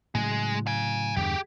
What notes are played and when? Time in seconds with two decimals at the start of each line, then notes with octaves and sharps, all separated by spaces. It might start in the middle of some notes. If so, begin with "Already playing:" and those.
0.15 A2 C#3 F#3 G#3
0.67 F5 G#5
1.17 E2 G2 D3 G4 G#4